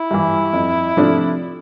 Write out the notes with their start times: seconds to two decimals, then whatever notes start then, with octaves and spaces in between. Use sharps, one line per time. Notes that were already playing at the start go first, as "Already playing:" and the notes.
Already playing: E4
0.11 G2 E3
0.53 F2
0.97 C3 F3 A3 D4